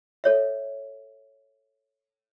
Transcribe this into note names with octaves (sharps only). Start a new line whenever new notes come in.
A4 C#5 E5